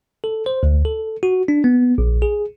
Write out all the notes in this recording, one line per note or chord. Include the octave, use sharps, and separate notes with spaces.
A4
C5
D2
A4
F#4
D4
B3
A#1
G#4